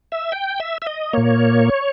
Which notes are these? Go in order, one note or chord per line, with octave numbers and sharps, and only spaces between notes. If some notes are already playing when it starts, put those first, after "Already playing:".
E5
G5
E5
E5
D#5
A#2 A#3 C#5